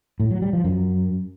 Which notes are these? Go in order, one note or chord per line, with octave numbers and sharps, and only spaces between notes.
A2
F#3
G3
F3
F#2